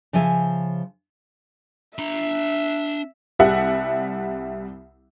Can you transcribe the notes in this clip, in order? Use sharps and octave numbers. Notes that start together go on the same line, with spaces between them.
C#3 F3 E5 G#5
D4 E5 A#5
C2 G3 E5 F#5